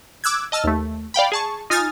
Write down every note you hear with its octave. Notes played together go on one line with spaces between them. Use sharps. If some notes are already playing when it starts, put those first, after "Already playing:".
D6 E6 F#6 G#6
D#5 A5 E6 F6
D#2 A3
D5 F5 G5 B5
G#4 A5 C#6
D#4 F4 G#5 D#6 F6 A6